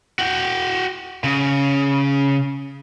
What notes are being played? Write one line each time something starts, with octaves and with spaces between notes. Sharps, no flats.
F#4 G5
C#3